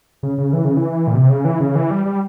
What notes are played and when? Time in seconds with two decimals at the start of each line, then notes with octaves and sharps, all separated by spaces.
0.23 C#3
0.38 C#3
0.53 E3
0.65 C#3
0.77 E3
1.08 A#2
1.15 C3
1.30 C#3
1.45 E3
1.60 C#3
1.75 E3
1.91 G3
2.05 G3